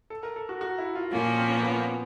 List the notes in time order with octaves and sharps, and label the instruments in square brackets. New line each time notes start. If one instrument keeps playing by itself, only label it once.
[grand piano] A4
A#4
A4
F#4
F#4
E4
F4
[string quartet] A#2 F3 A#3 C#4 [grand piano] F4
[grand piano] C4
B3
B3
C4